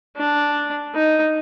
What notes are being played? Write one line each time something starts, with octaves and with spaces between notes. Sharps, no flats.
D4
D#4